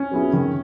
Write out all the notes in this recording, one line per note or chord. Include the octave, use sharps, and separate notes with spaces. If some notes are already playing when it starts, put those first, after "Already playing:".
Already playing: C#4
F#3 B3 E4 G#4
D#3